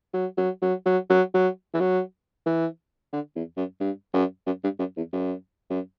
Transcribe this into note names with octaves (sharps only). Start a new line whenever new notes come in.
F#3
F#3
F#3
F#3
F#3
F#3
E3
F#3
E3
D3
E2
F#2
G2
F#2
F#2
G2
F#2
E2
F#2
F#2